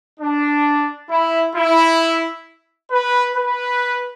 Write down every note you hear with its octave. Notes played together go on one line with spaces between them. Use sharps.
D4
E4
E4
B4
B4